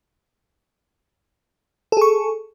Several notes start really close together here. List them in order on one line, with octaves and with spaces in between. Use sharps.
A4 G#4 C#6